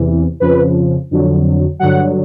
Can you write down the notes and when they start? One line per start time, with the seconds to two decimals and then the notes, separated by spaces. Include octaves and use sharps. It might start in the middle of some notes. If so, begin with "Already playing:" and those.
Already playing: E2 C3 E3
0.40 F2 C#3 F3 B4
1.11 F2 D3 F#3
1.80 G2 D3 F#3 F#5